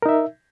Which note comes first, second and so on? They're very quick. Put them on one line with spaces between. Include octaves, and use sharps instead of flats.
A#4 D#4 E5